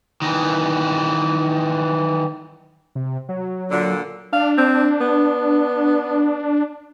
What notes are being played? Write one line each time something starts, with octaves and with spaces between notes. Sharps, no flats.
D#3 E3
C3
F#3
A#2 D3
D4 F5
C4
B3